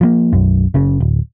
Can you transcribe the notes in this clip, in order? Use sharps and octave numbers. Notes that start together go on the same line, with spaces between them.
F3 F#3 A#3
B1 F#2
F#1 C#3
D1